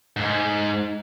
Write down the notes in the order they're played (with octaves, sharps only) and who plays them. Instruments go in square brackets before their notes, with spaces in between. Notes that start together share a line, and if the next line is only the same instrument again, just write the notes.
[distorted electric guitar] G#2